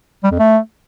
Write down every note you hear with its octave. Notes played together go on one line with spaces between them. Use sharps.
G3
F2
A3